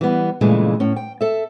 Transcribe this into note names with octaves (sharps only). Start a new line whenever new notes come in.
E3 G3 B3
G2 A#2 C#3 E3 G#3 A3
A2 C#4
G5
A4 E5